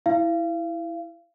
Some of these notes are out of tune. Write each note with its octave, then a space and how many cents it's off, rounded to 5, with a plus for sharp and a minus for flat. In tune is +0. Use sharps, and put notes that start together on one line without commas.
E4 +0 F5 -35